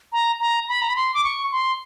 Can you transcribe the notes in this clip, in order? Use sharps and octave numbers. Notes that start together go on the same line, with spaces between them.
A#5
A#5
B5
A#5
B5
C6
D6
C#6
C6